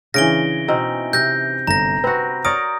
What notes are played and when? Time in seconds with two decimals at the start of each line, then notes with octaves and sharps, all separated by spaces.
0.14 C#3 E3 C#4 D4 A#6 D7 G7
0.68 B2 C4 D#4
1.13 C3 G6 A#6
1.67 G1 A#5 A#6
2.04 C4 F#4 B4
2.45 A#4 C#5 D5 D#6 D7